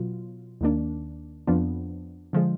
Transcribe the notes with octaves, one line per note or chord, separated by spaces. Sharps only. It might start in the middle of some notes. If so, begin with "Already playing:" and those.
Already playing: B2 F#3 F4
D#2 D#3 A#3 D4
F2 F3 B3 D4
D3 F3 G#3